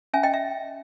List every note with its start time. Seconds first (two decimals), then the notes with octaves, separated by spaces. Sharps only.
0.13 C#4 E5 G#5
0.23 D#5 G5
0.34 E5